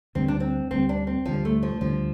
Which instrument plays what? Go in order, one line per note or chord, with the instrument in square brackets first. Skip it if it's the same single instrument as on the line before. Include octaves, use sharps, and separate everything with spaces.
[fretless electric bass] D2 D3 G3 [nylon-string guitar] C4
[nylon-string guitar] D4
C4
[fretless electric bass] D2 D3 G3 [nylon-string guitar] C4
[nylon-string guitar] D4
C4
[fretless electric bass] D2 D3 G3 [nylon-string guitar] F3
[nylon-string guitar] A3
F3
[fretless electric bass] D2 D3 G3 [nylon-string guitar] F3